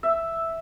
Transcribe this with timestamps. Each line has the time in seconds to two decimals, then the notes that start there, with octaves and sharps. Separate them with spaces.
0.03 E5